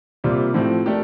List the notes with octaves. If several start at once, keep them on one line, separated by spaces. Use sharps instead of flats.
C3 G3 A#3 F4
A2 F3 A3 C4
A3 D4 G4 A#4